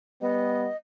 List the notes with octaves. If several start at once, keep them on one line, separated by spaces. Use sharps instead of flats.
G3 B3 D#5